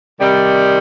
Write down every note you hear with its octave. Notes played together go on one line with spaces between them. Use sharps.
C3 D#3 G3